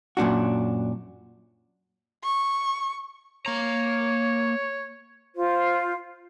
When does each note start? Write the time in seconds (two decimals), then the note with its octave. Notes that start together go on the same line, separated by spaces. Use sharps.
0.17 F#2 A#2 D4 F#4
2.24 C#6
3.46 A#3 C#5 A#5
5.35 F4 C5